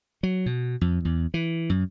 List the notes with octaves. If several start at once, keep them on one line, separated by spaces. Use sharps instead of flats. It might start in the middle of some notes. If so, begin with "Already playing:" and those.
F#3
B2
F2
E2
E3
F#2